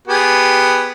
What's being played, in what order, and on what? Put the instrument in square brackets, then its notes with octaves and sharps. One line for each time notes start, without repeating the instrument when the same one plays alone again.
[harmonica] B3 G4 G#4